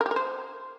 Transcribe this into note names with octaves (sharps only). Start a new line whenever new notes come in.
A#4
G4
A#4
C5